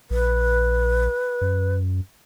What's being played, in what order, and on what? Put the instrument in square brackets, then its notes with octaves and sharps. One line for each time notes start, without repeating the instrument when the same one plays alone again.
[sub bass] A#1 [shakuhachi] B4
[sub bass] F#2